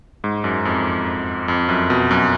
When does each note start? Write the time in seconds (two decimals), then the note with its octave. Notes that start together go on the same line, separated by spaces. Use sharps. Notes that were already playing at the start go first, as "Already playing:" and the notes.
0.24 G#2
0.44 F#2
0.65 F2
1.48 F2
1.69 F#2
1.90 B2
2.11 F#2